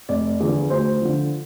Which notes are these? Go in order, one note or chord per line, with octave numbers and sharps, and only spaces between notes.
F1 D5
E2 D3 F3
D2 C5
D3 F3